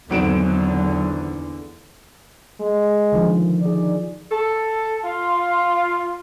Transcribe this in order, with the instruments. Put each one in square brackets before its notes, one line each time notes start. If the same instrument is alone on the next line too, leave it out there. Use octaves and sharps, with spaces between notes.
[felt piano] G#1 D7 E7 [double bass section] E2 D3 [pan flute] F#3
[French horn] G#3
[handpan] D3 D#3 F3
[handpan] D#4 G#4 [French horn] D5
[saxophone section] A4
F4